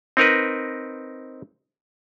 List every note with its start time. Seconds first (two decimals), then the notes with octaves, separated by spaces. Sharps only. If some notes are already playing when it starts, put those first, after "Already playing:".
0.17 C4 D#4 A#4 B4